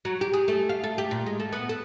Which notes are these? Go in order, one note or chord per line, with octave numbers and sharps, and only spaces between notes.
F#3
G4
G#4
A3
F5
A4
G4
A#2
G#3
A3
B3
A4